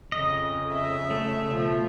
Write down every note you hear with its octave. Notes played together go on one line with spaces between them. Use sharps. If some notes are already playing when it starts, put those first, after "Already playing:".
F2 C#3 D#5
E5
A3
B2 F3